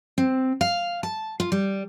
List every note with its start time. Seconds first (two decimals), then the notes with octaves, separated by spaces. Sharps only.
0.18 C4
0.61 F5
1.03 A5
1.40 F4
1.52 G3